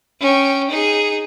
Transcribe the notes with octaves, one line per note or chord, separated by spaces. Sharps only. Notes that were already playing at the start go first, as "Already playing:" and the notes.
C#4 G5
D#4 G#4